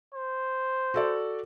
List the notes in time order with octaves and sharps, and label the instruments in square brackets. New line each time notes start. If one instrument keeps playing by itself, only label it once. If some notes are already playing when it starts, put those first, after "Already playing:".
[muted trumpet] C5
[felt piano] F#4 A4 D5